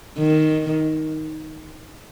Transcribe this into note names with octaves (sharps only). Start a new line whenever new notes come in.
D#3